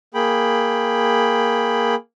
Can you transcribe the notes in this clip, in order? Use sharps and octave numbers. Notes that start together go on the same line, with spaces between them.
A#3 G#4 G5 B5